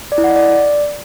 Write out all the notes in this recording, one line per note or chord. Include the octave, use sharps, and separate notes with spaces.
D5
E4
F#5
D#5
D5